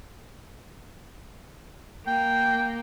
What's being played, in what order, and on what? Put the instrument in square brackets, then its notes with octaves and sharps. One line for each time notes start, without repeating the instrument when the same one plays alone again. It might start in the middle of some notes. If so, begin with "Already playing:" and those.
[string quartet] A#3 [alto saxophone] G5